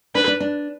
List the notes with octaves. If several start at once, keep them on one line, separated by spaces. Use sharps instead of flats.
D4 B4
D4
D4